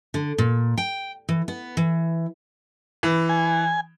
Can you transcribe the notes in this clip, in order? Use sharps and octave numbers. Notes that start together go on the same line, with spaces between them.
D3
A#2
G5
E3
B3
E3
E3
G#5